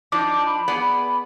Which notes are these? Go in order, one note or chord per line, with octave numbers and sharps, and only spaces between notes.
F3 D4 D#4 D6
B5
B3 G#4 D5 B5